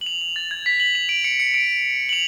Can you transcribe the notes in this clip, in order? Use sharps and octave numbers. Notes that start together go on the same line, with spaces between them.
F#7
F7
F7
A6
G#6
B6
F#7
F7
D7
C#7
C#7
D7
F#7
F7